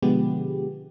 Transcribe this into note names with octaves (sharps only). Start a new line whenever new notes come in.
B2 D3 F3 G#3 B3 G4